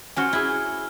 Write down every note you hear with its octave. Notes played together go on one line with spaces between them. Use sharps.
C#4 F#4 C5 G#5 F6 G7
E4 G#4